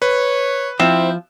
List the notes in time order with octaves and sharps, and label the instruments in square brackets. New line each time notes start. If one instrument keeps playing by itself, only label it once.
[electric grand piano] B4 [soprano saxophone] C#5
[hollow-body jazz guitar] F3 [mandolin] C4 [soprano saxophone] E4